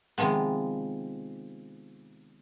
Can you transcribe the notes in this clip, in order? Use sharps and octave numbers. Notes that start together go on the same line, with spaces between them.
C3 D#3 F3 G#3 B3